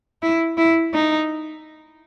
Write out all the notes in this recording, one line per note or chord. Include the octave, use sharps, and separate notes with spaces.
E4
E4
D#4